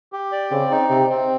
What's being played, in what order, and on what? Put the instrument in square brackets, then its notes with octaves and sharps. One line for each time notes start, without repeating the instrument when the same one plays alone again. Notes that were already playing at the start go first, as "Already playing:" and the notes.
[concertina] G4
D5
[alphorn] C#3 [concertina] C4
[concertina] D#4
[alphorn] C3 [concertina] C4
[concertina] C4